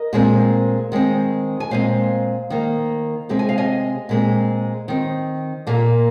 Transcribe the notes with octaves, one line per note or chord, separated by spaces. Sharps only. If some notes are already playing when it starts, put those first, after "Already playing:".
Already playing: A#4 D#5
A#2 G#3 C4
D#3 G#3 C4
G#5
A#2 G#3 C4 C5 F5
D#3 A#3
C3 G#3 C4
G#5
F5
D#5 G#5
A#2 G#3 C4
D#3 C4
A#2 A#3